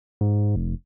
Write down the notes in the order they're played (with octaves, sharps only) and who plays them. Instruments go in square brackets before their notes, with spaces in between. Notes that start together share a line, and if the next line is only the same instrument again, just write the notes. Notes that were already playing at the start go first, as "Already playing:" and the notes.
[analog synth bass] G#2
F1